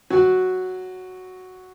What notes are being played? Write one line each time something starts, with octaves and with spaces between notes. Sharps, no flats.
F#3 F#4